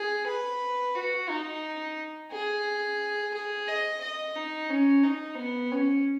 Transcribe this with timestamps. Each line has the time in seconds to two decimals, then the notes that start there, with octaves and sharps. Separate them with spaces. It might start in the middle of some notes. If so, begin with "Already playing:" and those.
Already playing: G#4
0.27 B4
0.95 F#4
1.29 D#4
2.31 G#4
3.34 G#4
3.68 D#5
4.01 D#5
4.36 D#4
4.70 C#4
5.03 D#4
5.38 B3
5.72 C#4